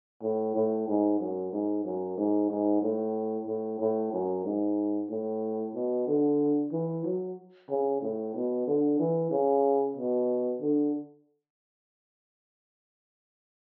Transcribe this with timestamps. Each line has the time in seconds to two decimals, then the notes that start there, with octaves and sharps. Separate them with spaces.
0.22 A2
0.55 A2
0.88 G#2
1.20 F#2
1.53 G#2
1.85 F#2
2.17 G#2
2.50 G#2
2.82 A2
3.47 A2
3.80 A2
4.13 F#2
4.45 G#2
5.10 A2
5.75 B2
6.07 D3
6.72 E3
7.04 F#3
7.70 C#3
8.02 A2
8.35 B2
8.67 D3
9.00 E3
9.31 C#3
9.97 B2
10.61 D3